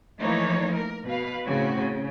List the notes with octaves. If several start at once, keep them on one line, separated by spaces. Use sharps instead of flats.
E3 F3 A3 A#3 D#4 C#5
A#4
B2 B4 F5
A2 C#3 C4 F#4
C#3